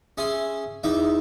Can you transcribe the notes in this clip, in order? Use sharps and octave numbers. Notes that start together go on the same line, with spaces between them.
C#4 G#4 E5 C6
E2 D#4 E5 D6